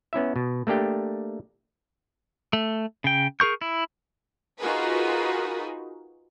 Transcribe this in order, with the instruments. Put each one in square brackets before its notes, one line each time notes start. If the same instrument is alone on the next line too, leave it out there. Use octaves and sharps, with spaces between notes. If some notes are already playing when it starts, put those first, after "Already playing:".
[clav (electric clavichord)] B3 C#4 E4 E5
B2
A3 A#3 D4 G4 G5
[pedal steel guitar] A3
C#3 G5
G#4 A#4 C#6 G6
E4
[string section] D#4 F4 F#4 G#4 A#4 B4